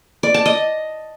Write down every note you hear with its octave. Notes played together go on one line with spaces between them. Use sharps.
D5
A5
D#5